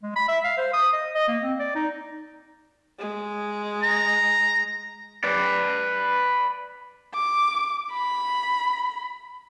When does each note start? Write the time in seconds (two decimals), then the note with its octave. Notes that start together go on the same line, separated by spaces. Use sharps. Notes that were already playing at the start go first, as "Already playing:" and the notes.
0.03 G#3
0.16 B5
0.28 E5
0.44 F5
0.58 C5
0.73 D#6
0.93 D#5
1.14 D#5
1.28 A#3
1.43 C4
1.60 D5
1.75 D#4
2.99 G#3
3.82 A#5
5.24 B4 D5
7.14 D6
7.92 B5